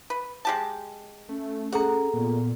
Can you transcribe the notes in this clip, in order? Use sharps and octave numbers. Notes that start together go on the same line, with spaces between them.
B4
G#3 G4 A5
A3 C#4
C#4 G#4 A4 F#5 A#5
A#2 B3